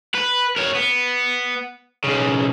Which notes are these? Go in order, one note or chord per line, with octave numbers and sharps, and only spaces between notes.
B4
A#4 C#5
B3
B1 C#3